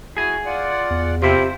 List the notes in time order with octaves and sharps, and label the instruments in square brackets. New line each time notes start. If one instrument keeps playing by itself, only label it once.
[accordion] E4 F#4 [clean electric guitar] G#4 G#5
[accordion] F4 D5 F#5
[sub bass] E2
[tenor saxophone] C3 [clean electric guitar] C4 E4 F4 [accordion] C5